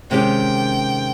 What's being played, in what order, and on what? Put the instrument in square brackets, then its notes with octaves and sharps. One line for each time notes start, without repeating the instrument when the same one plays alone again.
[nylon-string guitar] C3 D#3 G#3 C#4 G4 [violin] G5